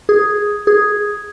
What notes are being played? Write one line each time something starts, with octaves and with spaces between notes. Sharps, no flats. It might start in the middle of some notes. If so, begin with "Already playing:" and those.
G#4
G#4